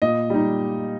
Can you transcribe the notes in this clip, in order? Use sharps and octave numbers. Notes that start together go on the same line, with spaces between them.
A#2 D#5
G3 D#4